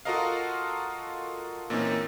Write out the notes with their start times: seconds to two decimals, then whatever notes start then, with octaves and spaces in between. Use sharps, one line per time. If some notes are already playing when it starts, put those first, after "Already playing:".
0.05 F4 F#4 A4 A#4 D#5 F5
1.70 A#2 E3 A#3 C4 C#4 D#4